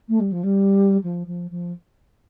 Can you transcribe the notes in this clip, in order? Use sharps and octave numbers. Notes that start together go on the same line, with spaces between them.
A3
G3
F3
G3
F3
F3
F3